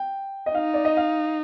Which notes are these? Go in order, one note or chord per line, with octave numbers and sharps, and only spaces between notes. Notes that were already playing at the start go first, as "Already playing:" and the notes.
Already playing: G5
D#5
D#4 F5
D5
D#5
F5